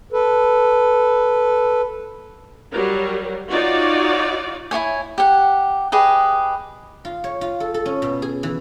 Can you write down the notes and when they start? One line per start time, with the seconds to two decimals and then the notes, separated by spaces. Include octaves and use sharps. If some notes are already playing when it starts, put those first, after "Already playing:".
0.13 A4 B4
2.73 F#3 G3 A#4
3.51 D#4 F4 F#4 C#5 D5
4.71 E4 F4 C#5 G#5
5.18 G4 F#5
5.92 G4 G#4 B4 D#5
7.05 F4
7.24 C#5
7.41 F4
7.60 A4
7.74 A4
7.86 C#4
8.02 B2
8.22 G#4
8.43 E3